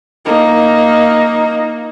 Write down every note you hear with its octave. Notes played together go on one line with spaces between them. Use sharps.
A#3 D#4